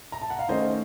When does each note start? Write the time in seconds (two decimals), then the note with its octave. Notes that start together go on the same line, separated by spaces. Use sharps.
0.12 A#5
0.22 A5
0.30 F#5
0.39 F5
0.49 D#3 A3 C#4 C5 D#5